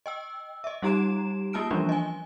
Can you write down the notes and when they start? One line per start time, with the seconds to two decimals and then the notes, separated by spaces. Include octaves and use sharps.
0.06 D#5 G5 E6
0.64 D#5 E5
0.82 G3 D#4 G4 A#5 D7 E7
1.53 A#3 F4 A5 F6 D7
1.71 E3 F3 G3 C#4 D4 F4
1.89 D#5 G#5